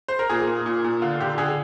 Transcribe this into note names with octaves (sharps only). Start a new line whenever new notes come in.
C5
A#4
A#2 G#4
A#2
A#2
A#2
D3 F4
D3 G4
D3 G#4